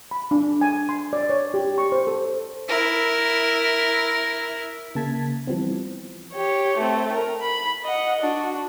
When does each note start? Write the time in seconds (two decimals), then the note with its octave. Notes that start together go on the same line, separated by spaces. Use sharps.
0.11 B5
0.31 D4
0.61 G#5
0.89 C6
1.13 D5
1.29 C#5
1.54 G4
1.78 C#6
1.92 C5
2.07 A4
2.68 E4 A#4
4.95 C#3 A#3 A5 G#6 B6
5.47 E3 F3 G3 B3 C4
6.34 G4 C#5
6.77 A3 C4
7.13 A#4
7.42 B5
7.84 D#5 F#5
8.22 D4 F#4